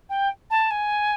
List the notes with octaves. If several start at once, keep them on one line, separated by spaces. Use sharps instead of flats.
G5
A5
G#5